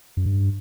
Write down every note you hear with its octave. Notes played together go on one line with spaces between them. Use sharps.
F#2
G2